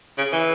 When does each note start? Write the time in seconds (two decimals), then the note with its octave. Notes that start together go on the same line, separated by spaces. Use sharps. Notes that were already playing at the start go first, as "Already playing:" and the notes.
0.18 C#3
0.32 E3